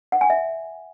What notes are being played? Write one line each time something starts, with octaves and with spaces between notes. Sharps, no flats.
F#5
G#5
E5